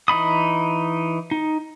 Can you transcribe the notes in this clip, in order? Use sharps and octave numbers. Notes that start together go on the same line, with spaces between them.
E3 D#4 B5 D#6
D#4